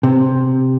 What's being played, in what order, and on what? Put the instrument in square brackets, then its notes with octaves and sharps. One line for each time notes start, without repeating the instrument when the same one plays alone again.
[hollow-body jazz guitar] C3